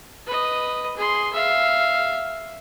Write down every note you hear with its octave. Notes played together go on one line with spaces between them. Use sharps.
B4 D#5
G#4 C6
E5 F5